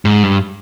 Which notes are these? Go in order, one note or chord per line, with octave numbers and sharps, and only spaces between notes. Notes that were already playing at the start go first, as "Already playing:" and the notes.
G#2
G2